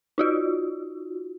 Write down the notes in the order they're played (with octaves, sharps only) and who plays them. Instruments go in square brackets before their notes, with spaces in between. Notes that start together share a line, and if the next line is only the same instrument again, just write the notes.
[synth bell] D#4 F4 F#4